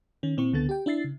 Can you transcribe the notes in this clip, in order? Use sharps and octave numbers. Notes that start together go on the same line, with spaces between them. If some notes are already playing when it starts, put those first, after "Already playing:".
D#3 C#4
A#2 C4 E4 C#6
C#2 D3 B3 A4 A6
G4 G5
D4 E4 E5 A6 C7
C#3